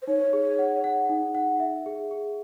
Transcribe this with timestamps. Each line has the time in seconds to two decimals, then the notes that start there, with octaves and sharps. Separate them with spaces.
0.02 C5
0.07 D#4 C#5
0.33 G#4
0.59 F#5
0.84 F#5
1.10 D#4
1.35 F#5
1.60 E5
1.86 G#4
2.11 G#4